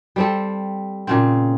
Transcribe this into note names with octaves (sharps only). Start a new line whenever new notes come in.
G3 C4 A4
A#2 C#3 C4